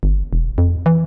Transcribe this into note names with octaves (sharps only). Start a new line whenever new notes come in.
G1
E1
F2
E3